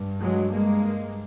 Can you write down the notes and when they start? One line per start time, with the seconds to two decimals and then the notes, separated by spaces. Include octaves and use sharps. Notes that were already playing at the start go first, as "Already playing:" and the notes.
Already playing: G2
0.22 F#3 G#3
0.53 G#3 A#3